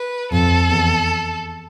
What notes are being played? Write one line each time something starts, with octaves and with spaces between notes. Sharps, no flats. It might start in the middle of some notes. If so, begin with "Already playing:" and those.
Already playing: B4
F2 A4
E2